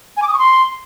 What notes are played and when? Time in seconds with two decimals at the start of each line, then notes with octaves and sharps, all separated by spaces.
0.17 G#5
0.22 D6
0.28 D#6
0.33 C#6
0.39 C6